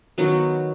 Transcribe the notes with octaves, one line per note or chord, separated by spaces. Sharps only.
D#3 F#3 B3